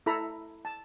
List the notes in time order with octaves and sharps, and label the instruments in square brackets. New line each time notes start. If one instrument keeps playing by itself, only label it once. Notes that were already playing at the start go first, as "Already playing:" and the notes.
[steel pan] E4 A4 A#5 B5
A5